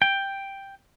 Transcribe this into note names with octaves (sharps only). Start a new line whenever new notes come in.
G5